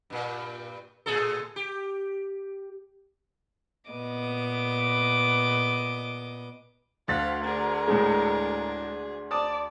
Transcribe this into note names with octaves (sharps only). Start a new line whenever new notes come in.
G2 A#2
A2 G#4 A4
G4
A#2 B3 D#5 D6
D2 F5 F#5 A6 B6
D4 G#4 A#4
A2 G#3
D5 A5 D#6